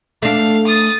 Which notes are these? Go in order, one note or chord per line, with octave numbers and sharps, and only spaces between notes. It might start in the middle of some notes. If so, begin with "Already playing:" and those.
A3 D4 F5
D#6 A6